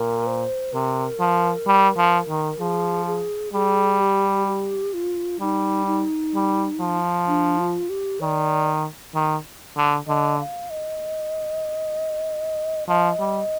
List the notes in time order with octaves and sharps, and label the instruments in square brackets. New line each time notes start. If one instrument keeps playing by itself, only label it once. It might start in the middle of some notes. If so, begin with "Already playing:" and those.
Already playing: [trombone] A#2 [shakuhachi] A#4
[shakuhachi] C5
[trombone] C3 [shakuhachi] A#4
[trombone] F3
G3
F3
D#3
[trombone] F3 [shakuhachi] G#4
[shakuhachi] G#4
[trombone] G3 [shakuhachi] G#4
[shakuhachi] G4
G4
F4
[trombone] G3 [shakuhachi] D#4
[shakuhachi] D#4
[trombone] G3
F3
[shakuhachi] D4
F4
G4
[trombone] D#3 [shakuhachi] D5
[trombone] D#3
D3
[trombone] D3 [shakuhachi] D#5
[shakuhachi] F5
D#5
[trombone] F3 [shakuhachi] D#5
[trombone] G3